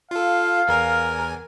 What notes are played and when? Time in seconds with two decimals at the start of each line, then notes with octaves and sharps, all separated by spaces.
0.11 F4 A4 F5
0.68 E2 A#4 G#5